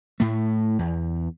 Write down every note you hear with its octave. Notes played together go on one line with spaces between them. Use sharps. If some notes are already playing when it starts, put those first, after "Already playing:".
A2 A3
E2